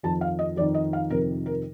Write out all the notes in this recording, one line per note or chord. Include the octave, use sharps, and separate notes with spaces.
F2 D#3 A5
F5
D#5
F2 D#3 D5
D#5
F5
F2 C3 D#3 A#4
A#4